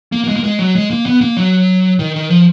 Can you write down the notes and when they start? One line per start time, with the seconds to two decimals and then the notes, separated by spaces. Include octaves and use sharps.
0.12 A#3
0.24 A#3
0.28 G#3
0.36 A#3
0.44 G#3
0.59 F#3
0.75 G#3
0.90 A#3
1.06 B3
1.21 A#3
1.37 F#3
1.99 D#3
2.16 D#3
2.30 F3